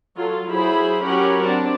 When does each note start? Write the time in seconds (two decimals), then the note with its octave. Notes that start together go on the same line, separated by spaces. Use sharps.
0.17 F#3 F4 A4
0.48 F#3 E4 G#4 C5 B5
1.03 F#3 C#4 G4 A#4 F#5 B5
1.46 C4 D4 A5